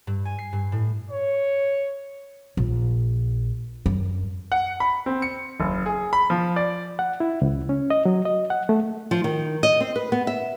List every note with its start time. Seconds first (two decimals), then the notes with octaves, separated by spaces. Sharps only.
0.07 G2
0.25 G#5
0.39 C7
0.53 G2
0.72 A2
1.11 C#5
2.57 A#1
3.86 F#2
4.52 F#5
4.80 B5
5.06 C4
5.22 C#7
5.60 F#1
5.86 G#4
6.13 B5
6.30 F3
6.56 D5
6.99 F#5
7.20 E4
7.42 C#2
7.69 C#4
7.90 D#5
8.05 F#3
8.25 D#5
8.50 F#5
8.69 A3
9.11 F3
9.24 D#3
9.63 D#5
9.80 C4
9.96 B4
10.12 B3
10.27 E5